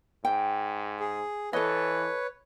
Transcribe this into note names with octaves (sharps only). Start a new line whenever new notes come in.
G#2 G5
G#4
E3 A4 B4 C#5 D#5